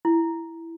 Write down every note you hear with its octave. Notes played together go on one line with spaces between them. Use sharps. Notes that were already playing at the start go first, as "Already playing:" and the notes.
E4